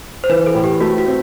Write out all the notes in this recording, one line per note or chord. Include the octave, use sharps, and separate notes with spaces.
C5
E3 B4
A4
A2
G4
A3 F#4
F#4
C4